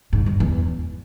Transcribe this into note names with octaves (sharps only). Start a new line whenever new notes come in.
G#2
G2
E2